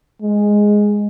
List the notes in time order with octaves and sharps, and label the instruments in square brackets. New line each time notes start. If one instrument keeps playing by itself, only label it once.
[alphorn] G#3